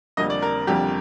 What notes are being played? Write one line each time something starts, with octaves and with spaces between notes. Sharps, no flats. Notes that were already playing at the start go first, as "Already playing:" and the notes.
F1 F2 D3 G3 A#3 D#5
D5
A#4
F1 F2 D3 G3 A#3 G4